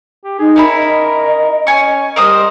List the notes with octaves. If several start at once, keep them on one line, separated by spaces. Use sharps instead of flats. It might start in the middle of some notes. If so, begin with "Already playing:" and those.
G4
D#4 G#4
C#4 E4 A#4 B5
D#5
C#4 G#5 C#6
G3 A#4 C5 D#5 D#6